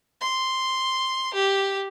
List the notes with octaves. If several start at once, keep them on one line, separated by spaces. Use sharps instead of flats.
C6
G4